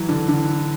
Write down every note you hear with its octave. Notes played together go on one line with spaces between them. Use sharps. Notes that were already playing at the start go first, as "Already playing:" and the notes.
Already playing: E3 F#3
D3
D3